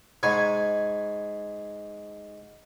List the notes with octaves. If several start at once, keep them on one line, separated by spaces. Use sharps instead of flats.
G#2 C#5 G#5 B5